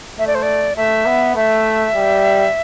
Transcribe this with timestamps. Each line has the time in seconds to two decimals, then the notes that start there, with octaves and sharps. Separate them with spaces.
0.18 A3 E5
0.27 D5
0.35 C5
0.43 D5
0.76 A3 E5
1.06 B3
1.36 A3 E5
1.95 G3